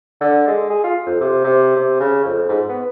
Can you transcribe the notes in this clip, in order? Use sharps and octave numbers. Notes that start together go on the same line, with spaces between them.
D3
G#3
G#4
F4
F2
C3
C3
C3
C#3
F2
G#2
B3